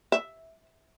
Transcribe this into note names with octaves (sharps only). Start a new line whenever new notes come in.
E5